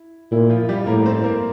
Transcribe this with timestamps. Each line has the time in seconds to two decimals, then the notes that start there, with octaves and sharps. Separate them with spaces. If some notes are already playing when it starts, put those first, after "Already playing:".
Already playing: E4
0.31 A#2 E4
0.49 F3 F4
0.69 G3 G4
0.86 A2 A#3 A#4
1.05 C4 C5
1.24 A#3 A#4